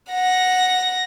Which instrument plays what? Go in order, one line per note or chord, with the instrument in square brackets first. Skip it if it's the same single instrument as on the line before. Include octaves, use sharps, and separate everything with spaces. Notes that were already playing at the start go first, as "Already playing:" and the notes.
[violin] F#5 A#6